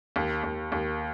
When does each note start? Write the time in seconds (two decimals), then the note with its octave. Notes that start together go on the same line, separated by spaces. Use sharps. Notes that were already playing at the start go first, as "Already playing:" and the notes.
0.16 D#2
0.43 D#2
0.72 D#2